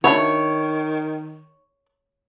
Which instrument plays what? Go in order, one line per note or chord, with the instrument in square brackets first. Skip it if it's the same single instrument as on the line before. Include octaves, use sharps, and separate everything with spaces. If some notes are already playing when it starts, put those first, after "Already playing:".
[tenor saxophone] D#3 [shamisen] D4 E4 F#4 [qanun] C#5